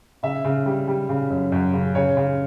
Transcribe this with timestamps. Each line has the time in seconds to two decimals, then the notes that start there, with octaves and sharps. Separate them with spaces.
0.23 C#3 E5
0.44 C#3
0.66 G3
0.88 G3
1.09 C#3
1.30 F#2
1.52 F#2
1.74 C#3
1.95 C#3 C#5
2.17 C#3